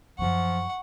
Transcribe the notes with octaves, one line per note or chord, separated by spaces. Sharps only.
F#2 F3 F#3 F#5 C#6